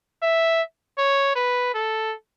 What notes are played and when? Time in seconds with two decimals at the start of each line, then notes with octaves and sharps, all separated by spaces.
0.22 E5
0.98 C#5
1.36 B4
1.74 A4